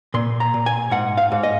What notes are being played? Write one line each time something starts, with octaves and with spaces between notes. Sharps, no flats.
A#2 C6
A#5
A#2
G#5
G#2 F#5
F5
G#2
D#5